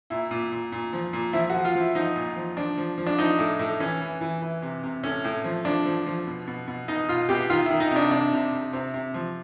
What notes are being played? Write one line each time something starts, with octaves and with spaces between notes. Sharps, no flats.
A#2 E4
A#2
A#2
A#2
F3
A#2
F3 E4
F#4
F3
F4
F3
E4
F3 D#4
A#2
F3
F3 D4
F3
F3
D4
F3 D#4
A2
A2
E3 C#4
E3
E3
E3
C3
C3
A2 C#4
A2
F3
F3 D4
F3
F3
B2
B2
B2
B2 D#4
B2 F4
B2 G4
D#3 F4
E4
D#3
D#4
C3 D4
C3 D4
C3
C3
C3 C4
C3
F3